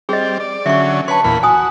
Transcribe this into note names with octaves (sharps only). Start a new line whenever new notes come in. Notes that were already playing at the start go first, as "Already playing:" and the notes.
G3 C4 G#4 D#5
D5
D3 F#3 C#4 E5 C#6
B4 C#5 A5 C6
E2 A#2 B5
F#4 G#5 D#6